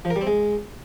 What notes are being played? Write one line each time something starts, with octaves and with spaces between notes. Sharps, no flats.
F3
A#4
G3
C4
G#3